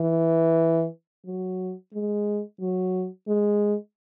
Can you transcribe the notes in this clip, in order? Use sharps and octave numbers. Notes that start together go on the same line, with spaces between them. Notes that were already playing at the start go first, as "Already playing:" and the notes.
Already playing: E3
F#3
G#3
F#3
G#3